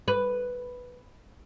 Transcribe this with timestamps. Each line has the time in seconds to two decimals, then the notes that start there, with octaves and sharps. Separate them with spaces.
0.08 B4